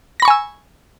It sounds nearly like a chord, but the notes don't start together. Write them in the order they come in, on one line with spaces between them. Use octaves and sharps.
A#6 B5 C#6 G#5 E6